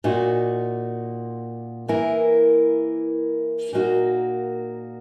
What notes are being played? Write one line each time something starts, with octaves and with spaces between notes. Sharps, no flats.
A#2 A#3 D#4 F#4
E3 A#3 E4 A#4
A#2 A#3 D#4 F#4